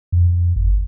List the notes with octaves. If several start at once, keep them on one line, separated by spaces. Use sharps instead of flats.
F2
G1